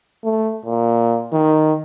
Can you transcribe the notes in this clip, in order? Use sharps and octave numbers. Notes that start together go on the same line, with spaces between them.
A3
A#2
D#3